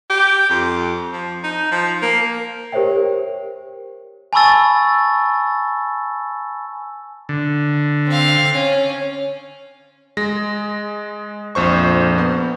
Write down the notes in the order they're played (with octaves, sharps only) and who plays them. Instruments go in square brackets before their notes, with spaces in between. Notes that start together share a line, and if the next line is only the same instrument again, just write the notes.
[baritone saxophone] G4
F2
F3
D#4
F3
A#3
[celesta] G4 A#4 C5 C#5 E5 G5
[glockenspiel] G#5 A5 B5 C#6 E6 A6
[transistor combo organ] D3
[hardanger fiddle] C4 F5
C#4
[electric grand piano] G#3 A#6
A#1 F2 C5 C#6
B3